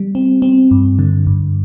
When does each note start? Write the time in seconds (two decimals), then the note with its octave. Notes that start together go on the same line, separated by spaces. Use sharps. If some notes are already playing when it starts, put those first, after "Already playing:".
Already playing: G3
0.15 C4
0.42 C4
0.71 G2
0.99 D3
1.27 G2